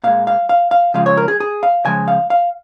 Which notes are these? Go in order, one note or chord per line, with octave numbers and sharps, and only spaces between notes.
A#2 G#3 F5
F5
F5
F5
C#3 F3 G#3 F5
C#5
A#4
G#4
G#4
F5
C#3 F3 G#3 G#5
F5
F5